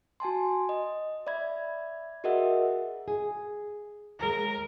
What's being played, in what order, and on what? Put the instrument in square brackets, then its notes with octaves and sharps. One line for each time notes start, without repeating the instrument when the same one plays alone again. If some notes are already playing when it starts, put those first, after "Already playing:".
[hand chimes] F#4 G#5 A5 C6
D#5
D5 E5 B5 G#6
F#4 G#4 A#4 D#5 E5 F#5
[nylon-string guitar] G#4
[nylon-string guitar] D#2 G#3 [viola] A#4